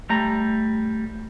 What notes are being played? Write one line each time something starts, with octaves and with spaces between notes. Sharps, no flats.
G3 A3 A#5